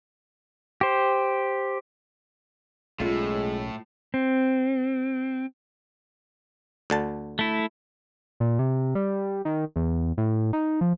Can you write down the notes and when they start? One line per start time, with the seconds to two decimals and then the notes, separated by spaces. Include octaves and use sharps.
0.81 G4 C5
3.00 B1 A2 G#3 A3 C#4 F4
4.14 C4
6.90 D2 D3 A5
7.39 A3 E4
8.40 A#2
8.59 C3
8.95 G3
9.45 D#3
9.76 E2
10.18 A2
10.53 D#4
10.81 F3